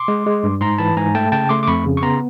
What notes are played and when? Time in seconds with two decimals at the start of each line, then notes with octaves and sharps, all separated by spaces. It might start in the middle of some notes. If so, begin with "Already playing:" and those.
Already playing: C6 D6
0.08 G#3
0.26 G#3
0.43 G2
0.61 G#2 A#5 C6
0.78 E3 A5 B5
0.97 G#2 G#5 A#5
1.15 A3 G5 A5
1.32 C#3 G5 A5
1.49 A3 C6 D6
1.63 D6
1.67 F2 B5 C#6
1.85 C#3
1.97 C#6
2.02 B3 A#5 C6